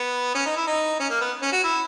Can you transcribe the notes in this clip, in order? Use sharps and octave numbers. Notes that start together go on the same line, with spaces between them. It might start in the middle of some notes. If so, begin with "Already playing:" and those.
Already playing: B3
C#4
D#4
E4
D#4
C#4
A#3
B3
C#4
F#4
E4